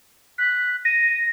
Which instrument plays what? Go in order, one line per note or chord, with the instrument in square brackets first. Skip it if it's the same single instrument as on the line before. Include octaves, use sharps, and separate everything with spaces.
[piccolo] F#6 [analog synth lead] B6
[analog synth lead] A#6 [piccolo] D#7